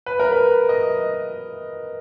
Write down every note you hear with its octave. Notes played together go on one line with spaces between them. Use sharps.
B4
A#4
B4
D#5